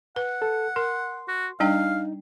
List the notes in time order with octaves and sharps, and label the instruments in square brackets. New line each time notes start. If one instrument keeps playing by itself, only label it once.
[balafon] B4 [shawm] F#5
[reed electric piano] A4
[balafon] A#4 [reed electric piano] C6
[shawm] F#4
[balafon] G3 D4 G5 [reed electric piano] D#4 [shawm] F5